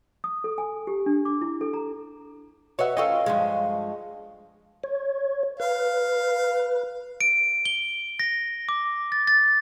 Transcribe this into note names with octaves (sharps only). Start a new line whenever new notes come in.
D#6
A4
G#5
G4
D4
D6
E4
A4
A#5
F#4 B4 C#5 D#5 E5 F#5
C#4 F4 A4 D#5 F5 G5 C#6
G2 F3 G#3
C#5
B4 F5
D7
G7
A#6
D6
A6
A6